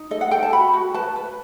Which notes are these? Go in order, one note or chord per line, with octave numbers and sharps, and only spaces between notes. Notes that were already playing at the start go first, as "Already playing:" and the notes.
Already playing: D#4
A4 D#5
F#5
A4 G5
A5
F#4 B5
F#4
B4 A5
B4